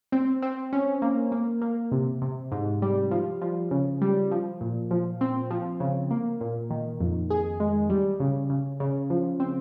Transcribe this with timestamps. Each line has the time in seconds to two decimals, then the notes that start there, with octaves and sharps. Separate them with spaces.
0.12 C4
0.42 C4
0.73 C#4
1.02 A#3
1.32 A#3
1.62 A#3
1.92 C3
2.22 C3
2.52 G#2
2.82 G3
3.11 F3
3.42 F3
3.71 C#3
4.01 G3
4.31 F3
4.61 A#2
4.91 F3
5.21 C4
5.51 F3
5.80 C#3
6.11 A#3
6.41 A#2
6.70 D#3
7.00 F2
7.30 G#4
7.60 G#3
7.90 G3
8.20 C#3
8.50 C#3
8.80 C#3
9.10 F3
9.40 C4